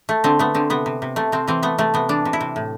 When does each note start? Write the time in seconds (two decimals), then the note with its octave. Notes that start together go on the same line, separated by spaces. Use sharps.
0.09 A3
0.24 D3 C4
0.39 A3 B3
0.54 D3 C4
0.70 C3 B3
0.86 C3
1.02 C3
1.16 C3 A3
1.32 C3 C4
1.47 E3 C4
1.63 A3 B3
1.78 C3 A3
1.94 C3 B3
2.09 E3 D4
2.25 C3
2.33 E4
2.41 C3
2.56 A2